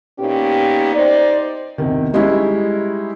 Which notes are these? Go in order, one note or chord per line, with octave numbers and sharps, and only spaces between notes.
A#2 B3 C#4 D#4 G4
D#4 C5 D5
E2 C3 D#3
G3 G#3 C#4 D#4 E4